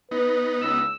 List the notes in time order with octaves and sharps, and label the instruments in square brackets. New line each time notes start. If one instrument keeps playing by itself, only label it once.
[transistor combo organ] B3 D#4 [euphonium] B4
[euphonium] C#2 [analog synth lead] E6